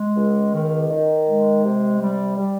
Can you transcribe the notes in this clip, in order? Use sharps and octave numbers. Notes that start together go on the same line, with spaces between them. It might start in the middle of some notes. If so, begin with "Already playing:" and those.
Already playing: G#3
C#2
D#3
D#3
G#3
C3
G3
G3